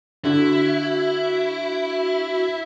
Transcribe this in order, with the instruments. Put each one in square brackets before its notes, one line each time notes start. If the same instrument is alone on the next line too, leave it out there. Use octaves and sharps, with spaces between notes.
[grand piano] D3 [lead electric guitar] E4 [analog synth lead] F#4